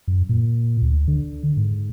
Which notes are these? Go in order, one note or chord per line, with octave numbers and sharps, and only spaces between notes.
F#2
A#2
D2
D3
G#2